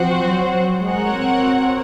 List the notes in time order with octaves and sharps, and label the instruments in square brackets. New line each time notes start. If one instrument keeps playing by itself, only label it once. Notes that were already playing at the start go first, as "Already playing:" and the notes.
Already playing: [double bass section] F3 [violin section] C4 F#4 C5 F#5
[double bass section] F#3
[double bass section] G#3 [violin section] F#4 A#4 C#5 F#5
[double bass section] C4